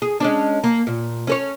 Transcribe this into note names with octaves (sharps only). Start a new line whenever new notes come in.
G#4
G#3 C#4 D4
A#3
A#2
C#4 A4 C#5